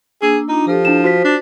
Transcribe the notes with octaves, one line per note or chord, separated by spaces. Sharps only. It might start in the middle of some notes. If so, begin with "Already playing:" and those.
A#3 D4 G#4 E6
D4 D#4 F4
F3 G4 A4
D4 E4 E7
F4 F#4 C5 B6
D4